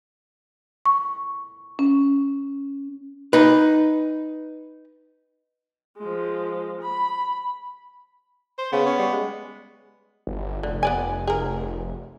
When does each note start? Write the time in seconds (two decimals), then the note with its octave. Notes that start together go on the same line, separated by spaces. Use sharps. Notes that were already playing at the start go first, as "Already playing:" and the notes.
0.86 C#6
1.79 C#4
3.33 D#4 B4
5.98 F3 G#3
6.81 B5
8.58 C5
8.73 C#3 B3
8.86 C#4
8.98 G3
9.12 G#3
10.27 G1
10.63 F1 D3
10.83 B3 D5 G#5
11.27 G#4 A#4